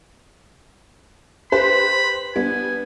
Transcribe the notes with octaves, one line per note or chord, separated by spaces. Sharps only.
G4 B4 C5 B5
G3 B3 D4 G#5